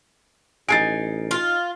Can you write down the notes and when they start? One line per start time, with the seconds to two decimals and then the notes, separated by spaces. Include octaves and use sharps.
0.69 A1 D#4 F#4 G#5 A6 C7 D7
1.31 F4